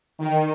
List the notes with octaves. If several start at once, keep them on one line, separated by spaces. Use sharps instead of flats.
D#3